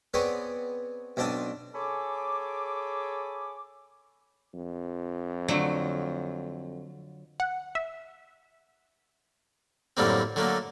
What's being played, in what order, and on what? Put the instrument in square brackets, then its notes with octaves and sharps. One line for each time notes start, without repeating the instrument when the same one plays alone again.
[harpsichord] B3 C4 G#4 C#5 D5 D#6
B1 C4 D4 A5 D#6
[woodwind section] G#4 A4 C#5 G#5 B5 D6
[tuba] F2
[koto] D3 F#3 A3
[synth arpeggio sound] F#5
E5
[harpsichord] F#2 A2 D3 G3 A#3 C4
D3 F#3 A3 A#3